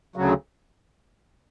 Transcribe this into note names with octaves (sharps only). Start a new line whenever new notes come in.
D2 C#3 F#3